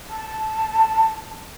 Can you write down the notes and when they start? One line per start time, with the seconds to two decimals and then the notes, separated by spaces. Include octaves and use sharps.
0.10 A5